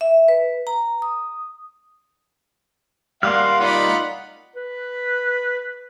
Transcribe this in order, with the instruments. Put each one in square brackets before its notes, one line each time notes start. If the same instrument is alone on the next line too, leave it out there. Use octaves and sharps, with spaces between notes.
[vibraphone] E5
B4
A#5
D#6
[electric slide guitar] G3 A#3 [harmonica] F5 F#5 [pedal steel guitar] C6 D6 F6
[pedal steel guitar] D#4 [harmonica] F4 D5 [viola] F#5 B5
[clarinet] B4